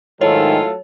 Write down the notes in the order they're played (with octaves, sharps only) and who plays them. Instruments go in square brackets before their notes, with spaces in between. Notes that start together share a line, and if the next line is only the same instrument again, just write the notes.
[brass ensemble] G#2 D#3 [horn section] F#3 A3 A4 [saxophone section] E4 F4 [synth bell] C#5